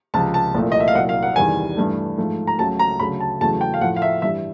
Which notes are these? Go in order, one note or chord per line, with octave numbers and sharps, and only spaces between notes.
C#2 C3 F3 A5
A5
C2 A#2 F3 A3
D#5
E5
F5
C2 A#2 F#3 F#5
F5
F#5
E2 C3 D#3 G3 G#5
G2 E3 A3
G#2 F3 A3
A#5
C#2 C#3 F#3 A3 A5
A#5
D2 C#3 F#3 A3 B5
A5
E2 C#3 F#3 A3 A5
G5
F5
A2 F3 A3 F#5
F5
E5
G2 E3 G3 E5